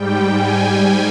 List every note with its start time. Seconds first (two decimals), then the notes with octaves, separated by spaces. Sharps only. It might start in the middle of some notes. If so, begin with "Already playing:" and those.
Already playing: G#2 G3 G5
0.36 G#5